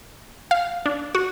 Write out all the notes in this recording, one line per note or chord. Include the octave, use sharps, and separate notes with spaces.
F5
D4
F#4